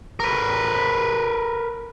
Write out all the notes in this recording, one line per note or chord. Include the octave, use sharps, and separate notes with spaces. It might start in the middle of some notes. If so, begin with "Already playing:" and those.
A#4 B4